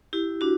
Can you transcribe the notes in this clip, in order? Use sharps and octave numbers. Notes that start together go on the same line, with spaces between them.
E4 G4
D4 F#4